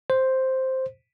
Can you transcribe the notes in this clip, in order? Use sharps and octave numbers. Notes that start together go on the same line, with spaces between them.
C5